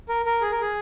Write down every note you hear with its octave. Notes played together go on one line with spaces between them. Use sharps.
A#4
A#4
G#4
A#4
G#4